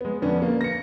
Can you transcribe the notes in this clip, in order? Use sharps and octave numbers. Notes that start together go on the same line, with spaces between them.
G#3 B3
F2 D3 B3 C#4 D4
A#3
A#6 C#7